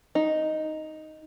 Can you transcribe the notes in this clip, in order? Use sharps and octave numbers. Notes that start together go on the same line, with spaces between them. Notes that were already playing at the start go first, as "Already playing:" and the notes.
D#4